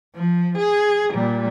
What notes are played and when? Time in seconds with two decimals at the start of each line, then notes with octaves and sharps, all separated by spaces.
0.15 F3
0.58 G#4
1.14 A#2 G3